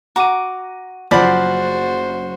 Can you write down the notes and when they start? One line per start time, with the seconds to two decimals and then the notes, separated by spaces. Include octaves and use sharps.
0.16 F#4 A#5 D6 D#7
1.11 F#1 F3 F#4 C5 D5 F#5 A#5 B5